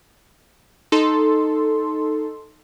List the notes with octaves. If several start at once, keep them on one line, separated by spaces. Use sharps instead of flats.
D#4 A4 C6